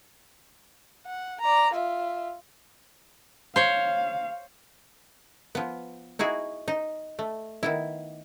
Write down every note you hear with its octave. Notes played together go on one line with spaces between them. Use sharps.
F#5
D5 A#5
F4 E5
C5 C#5 F5
F3 B3
D#4 E4 F#4 G#4
D#4
A3
D#3 B3 E4